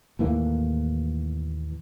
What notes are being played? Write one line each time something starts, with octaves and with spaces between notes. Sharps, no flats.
D#2 A2 E3 A#3